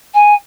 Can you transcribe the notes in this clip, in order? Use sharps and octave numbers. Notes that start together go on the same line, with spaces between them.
G#5